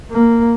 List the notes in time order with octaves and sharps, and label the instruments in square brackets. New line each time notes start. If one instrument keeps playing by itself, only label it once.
[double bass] A#3